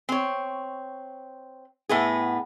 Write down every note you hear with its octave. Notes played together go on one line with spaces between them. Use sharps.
C4 C#5
A2 B3 G#4